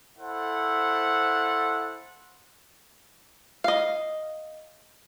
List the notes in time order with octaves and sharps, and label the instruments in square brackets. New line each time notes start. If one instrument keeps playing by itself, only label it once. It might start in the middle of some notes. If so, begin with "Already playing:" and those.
[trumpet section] E4 A4 C5 F#5
[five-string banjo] D#5 F5